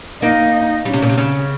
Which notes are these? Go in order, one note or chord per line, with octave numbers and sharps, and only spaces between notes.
A#3 D#4
G3 C#4
C3
A#2
C3
C#3